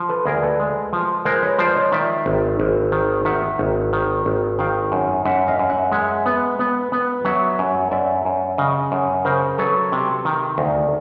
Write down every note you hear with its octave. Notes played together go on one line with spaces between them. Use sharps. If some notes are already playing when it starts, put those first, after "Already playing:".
Already playing: F3
A4 B4
D2 G#4 A#4
A4 B4
G#3
F3
G#3 A#4 C5
B4 C#5
F3 C5 D5
C#5 D#5
D#3 D5 E5
G#1
G#1
D#3
D#3 E5 F#5
G#1
D#3
G#1
D#3 F5 G5
F#2
F#2 E5 F#5
D#5 F5
F#2
E5 F#5
G#3 E5 F#5
B3
B3
B3
F#3 E5 F#5
F#2
F#2 D5 E5
F#2
C#3 D#5 F5
F#2
C#3 A#4 C5
F#3 A4 B4
C3
D#3
D2